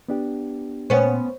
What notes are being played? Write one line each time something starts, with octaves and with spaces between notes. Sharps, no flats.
B3 D4 G4
A#2 B3 C#4 C5 C#5